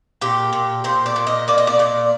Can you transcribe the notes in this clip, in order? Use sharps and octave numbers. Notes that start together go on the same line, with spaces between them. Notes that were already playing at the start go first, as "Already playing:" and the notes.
A#2 G4
A#2
A#2 C5
D5
A#2
D#5
A#3 D5
D#5
D5
A#2 D5